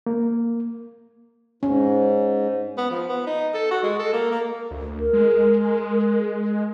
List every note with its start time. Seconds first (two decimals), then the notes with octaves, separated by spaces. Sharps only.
0.06 A#3
1.63 G#2 C#4
2.78 B3
2.91 F3
3.09 B3
3.27 D#4
3.54 A4
3.71 F#4
3.83 G#3
3.99 A4
4.13 A#3
4.31 A#3
4.71 D2
4.99 A#4
5.13 G#3